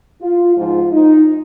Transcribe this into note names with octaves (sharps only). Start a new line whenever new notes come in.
F4
G#2 F3 F4
D#4